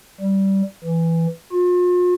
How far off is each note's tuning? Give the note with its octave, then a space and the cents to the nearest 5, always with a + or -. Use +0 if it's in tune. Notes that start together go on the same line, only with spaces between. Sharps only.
G3 -15
E3 +5
F4 +40